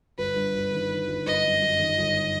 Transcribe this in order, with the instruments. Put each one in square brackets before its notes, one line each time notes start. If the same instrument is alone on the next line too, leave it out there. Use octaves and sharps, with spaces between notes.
[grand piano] G1 [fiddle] B4
[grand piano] G2
G1
D#3
D#3
G1
[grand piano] G1 [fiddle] D#5
[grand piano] F#2
F#2
D#3
G1